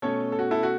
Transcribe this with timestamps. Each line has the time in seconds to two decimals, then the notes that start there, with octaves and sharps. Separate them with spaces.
0.02 B2 A3 C#4 A4 C#5
0.32 A4
0.39 F#4
0.51 E4 A4
0.63 F#4